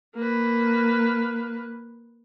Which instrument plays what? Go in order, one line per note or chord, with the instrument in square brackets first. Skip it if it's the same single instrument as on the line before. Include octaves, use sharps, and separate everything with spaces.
[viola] A#3 B4